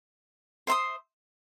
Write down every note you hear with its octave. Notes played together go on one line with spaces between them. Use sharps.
C5 E5 C6 D#6